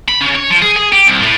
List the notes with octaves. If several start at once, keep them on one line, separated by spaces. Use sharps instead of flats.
B5
C#3
C#5
F3
G#4
G#4
G4
C2
A2